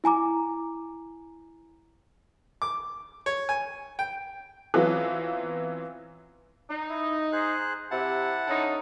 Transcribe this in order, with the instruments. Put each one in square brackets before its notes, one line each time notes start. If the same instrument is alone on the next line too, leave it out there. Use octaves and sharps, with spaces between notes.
[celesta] E4 G#5 A#5 D6
[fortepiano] D6
C#5
G#5
G5
[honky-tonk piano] E3 F#3 B3 C4 F4
[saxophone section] D#4
[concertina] E4
G#4 C5 F#6
[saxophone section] C3 [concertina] E4 F#5 A5
[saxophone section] D3 C#4 D#4